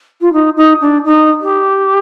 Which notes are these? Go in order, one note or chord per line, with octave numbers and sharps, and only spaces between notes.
F4
D#4
D#4
D4
D#4
G4